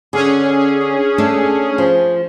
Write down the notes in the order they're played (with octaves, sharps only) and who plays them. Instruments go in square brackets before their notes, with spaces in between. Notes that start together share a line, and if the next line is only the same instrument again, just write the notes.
[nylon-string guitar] D3 [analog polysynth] C#4 G#4
[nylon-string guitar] A3 D4 A4
F3